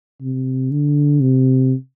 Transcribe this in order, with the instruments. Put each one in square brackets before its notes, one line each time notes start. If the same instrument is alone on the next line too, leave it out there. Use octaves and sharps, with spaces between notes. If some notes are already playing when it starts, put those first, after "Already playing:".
[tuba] C3
D3
C3